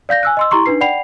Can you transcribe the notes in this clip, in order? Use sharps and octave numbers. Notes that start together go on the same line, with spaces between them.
D5 F5 G6 A#6
G#5 E6 F#6
D#5 C6 E6
E4 G4 A#5 C6 C#6
D4 D#4 B4 C7
D5 F#5 G5 B5 C7 F7